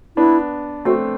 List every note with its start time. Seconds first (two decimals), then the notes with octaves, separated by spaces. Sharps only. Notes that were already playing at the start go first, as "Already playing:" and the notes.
0.17 B3 D4 E4
0.85 A3 C4 F#4